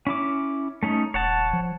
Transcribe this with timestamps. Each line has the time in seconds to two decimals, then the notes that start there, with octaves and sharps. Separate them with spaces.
0.07 C#4 E4 D6
0.83 A3 C#4 D#4
1.14 D#1 C#5 F#5 A5
1.53 F3